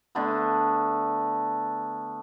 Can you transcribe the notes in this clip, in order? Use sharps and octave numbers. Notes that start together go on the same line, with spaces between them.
D3 A3 B3